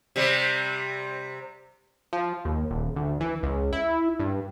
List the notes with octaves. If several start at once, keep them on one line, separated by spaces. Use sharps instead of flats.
C3 G3
F3
D#2
D#1
D2
E3
C#2
E4
G2